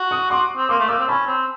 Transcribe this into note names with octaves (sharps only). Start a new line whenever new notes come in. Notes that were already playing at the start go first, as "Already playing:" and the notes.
Already playing: F#4
C#6 D#6
F#4 C6 D6
C4
A#3 C6 D6
A3
A#3 D6 E6
C4
C#4 A5 B5
C4